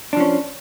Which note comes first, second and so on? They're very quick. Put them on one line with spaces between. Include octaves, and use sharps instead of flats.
D4 F3 C#4